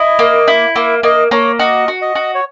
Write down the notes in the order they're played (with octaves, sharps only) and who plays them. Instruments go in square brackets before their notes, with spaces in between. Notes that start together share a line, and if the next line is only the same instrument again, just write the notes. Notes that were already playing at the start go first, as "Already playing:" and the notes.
Already playing: [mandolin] E4 [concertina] D#5
[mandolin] A#3
E4
[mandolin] A#3 [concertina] E5
[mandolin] A#3 [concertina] D#5
[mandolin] A#3 [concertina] C#5
[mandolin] F#4 [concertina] D#5
[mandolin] F#4
[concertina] D#5
[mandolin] F#4
[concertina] C#5